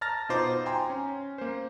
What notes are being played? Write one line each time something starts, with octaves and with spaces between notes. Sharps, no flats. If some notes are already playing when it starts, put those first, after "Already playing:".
A5 A#5 F6 A6 A#6
B2 D#4 F4 C5 D6
G5 G#5 A#5 C6
C#4
A#3 C5